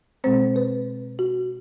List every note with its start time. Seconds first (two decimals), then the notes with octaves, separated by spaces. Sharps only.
0.24 B2 G#3 C4 C5
0.56 B4
1.19 F#4